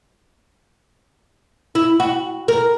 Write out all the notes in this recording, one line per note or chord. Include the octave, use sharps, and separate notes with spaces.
E4
F#4
A#4